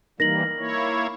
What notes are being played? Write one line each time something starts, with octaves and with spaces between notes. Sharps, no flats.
E3 G3 A#3 D#4 A#4 A#6 F#7
A#3 E4 C#5